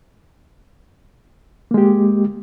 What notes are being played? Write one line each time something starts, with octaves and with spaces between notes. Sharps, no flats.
G#3 A#3 G4